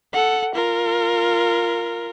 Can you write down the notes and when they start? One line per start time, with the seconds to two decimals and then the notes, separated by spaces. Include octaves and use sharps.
0.13 A4 F#5
0.54 F4 A#4